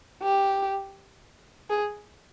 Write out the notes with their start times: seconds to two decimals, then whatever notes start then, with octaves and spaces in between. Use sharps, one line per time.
0.23 G4
1.70 G#4